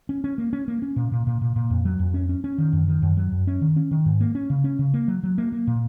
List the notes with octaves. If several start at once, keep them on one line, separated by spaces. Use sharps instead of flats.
C#4
C#4
A#3
C#4
A#3
C#4
A#2
A#2
A#2
A#2
A#2
F2
F#3
F2
C#4
C#4
C#4
D#3
F#2
D#3
F#2
F#3
F#2
C#4
D#3
C#4
D#3
G#2
A#3
C#4
C#3
C#4
C#3
A#3
F#3
F#3
A#3
A#3
A#2